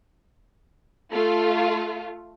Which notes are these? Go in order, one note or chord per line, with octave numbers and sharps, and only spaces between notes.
A3 F4